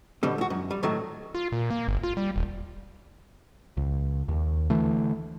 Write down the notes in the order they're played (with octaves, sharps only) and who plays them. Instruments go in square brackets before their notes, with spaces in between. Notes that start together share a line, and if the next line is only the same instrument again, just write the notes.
[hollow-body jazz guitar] B2 D3 G3 C4
E2 F#4
F#2
G3
A2 D#3 F#3 A3
[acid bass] F4
A#2
A#3
G1
F4
G3
D#1
[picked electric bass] C#2
D#2
D3 E3 A3